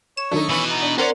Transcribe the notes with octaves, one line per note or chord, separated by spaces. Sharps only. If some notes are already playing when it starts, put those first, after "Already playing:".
C#5 E7
D#3 F#3 A3 D4 D#4
B2 E3 B3 C#4 B4 C#6 E6
D#4
D4
C4 C#4 A#4 D5 F#5 A#5 C6